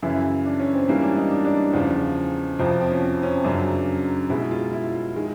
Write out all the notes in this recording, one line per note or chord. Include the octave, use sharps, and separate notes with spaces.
F#2 C#3 E3 E4
D4
C#4
C4
G#2 E3 G3 A#3 C#4
D4
D#4
D4
D4
E2 C#3 F3
F2 C3 F3 C4
C4
C#4
C4
C#4
F#2 C#3 F#3 D4
B2 G#3 E4
F4
E4
D#3 G#3